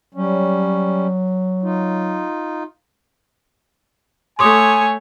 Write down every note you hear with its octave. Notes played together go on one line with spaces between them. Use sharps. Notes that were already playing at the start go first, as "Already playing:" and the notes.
F#3 G3 C#4
D#4 F4
A3 C#5 G#5 C6 D6 D#6